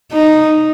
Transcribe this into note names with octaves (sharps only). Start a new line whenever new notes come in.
D#4